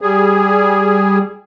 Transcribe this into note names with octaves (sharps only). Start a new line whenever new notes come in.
G3 G#4